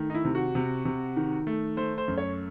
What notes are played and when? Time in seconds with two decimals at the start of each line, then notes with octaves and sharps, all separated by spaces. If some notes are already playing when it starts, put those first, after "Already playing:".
Already playing: D#3 A3
0.10 D#4
0.15 E4
0.24 C3
0.35 F#4
0.55 C3
0.85 C3
1.16 D#3
1.47 A3
1.77 A3 C5
1.98 C5
2.08 F#2
2.18 C#5